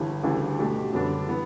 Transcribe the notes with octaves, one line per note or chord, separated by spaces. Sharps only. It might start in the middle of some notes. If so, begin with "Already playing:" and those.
Already playing: G1 G2 E3 G3
D2 C#3 E3 G3 D4
B2 A3 D4 G4
F#2 D3 G3 B3 D4
E3 B3